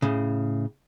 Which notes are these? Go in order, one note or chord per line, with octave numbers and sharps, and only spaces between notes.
A2 C#3